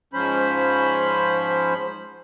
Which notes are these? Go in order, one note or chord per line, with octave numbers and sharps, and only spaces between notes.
G#2 F3 C#4 C5 B5